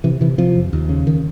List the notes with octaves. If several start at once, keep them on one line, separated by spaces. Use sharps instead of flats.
C3 E3
C3 E3
C3 F3
F2
D#2
C#3
D#3